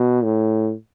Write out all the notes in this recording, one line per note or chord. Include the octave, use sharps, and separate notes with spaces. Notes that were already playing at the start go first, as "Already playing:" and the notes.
Already playing: B2
A2